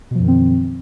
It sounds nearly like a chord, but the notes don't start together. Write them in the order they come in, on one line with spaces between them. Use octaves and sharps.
B2 F3 F#2 D#3 C4